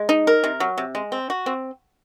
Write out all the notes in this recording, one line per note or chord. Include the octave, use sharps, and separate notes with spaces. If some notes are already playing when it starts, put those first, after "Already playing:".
Already playing: G#3
D#4
A#4
C3
F#3
C3
G#3
C4
F#4
C4